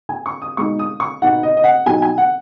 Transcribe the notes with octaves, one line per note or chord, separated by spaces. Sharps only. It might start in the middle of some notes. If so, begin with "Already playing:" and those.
G#5
C#6
D#6
B2 G#3 D#4 C#6
D#6
C#6
B2 B3 D#4 F#5
D#5
D#5
F#5
B2 F#3 D#4 G#5
G#5
F#5